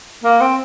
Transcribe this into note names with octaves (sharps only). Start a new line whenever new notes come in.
A#3
C4